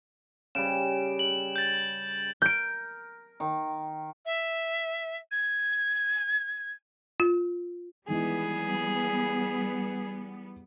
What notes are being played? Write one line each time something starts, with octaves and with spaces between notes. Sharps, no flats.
C#3 G3 D7 E7
F#7
G6 A6
A#4 G6 D7
D#3
E5
G#6
F4
D#3 E3 G3 G#3 B3 G#4